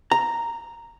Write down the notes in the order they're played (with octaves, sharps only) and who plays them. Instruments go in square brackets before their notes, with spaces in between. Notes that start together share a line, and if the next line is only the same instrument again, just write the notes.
[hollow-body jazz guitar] A#5